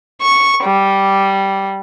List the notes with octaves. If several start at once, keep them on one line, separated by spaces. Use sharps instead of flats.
C#6
G3